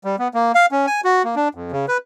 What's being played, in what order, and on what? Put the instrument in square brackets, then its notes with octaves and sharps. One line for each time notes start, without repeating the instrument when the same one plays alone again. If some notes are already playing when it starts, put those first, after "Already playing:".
[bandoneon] G3
B3
A#3
F5
C#4
G#5
F#4
A#3
D4
F2
C#3
B4